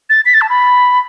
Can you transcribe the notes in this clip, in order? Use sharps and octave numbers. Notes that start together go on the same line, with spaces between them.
A6
B6
A6
A5
B5